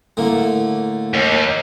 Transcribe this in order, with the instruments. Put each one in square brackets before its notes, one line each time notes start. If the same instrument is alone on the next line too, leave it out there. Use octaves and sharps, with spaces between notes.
[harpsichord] A2 D3 A#3
[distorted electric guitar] D#2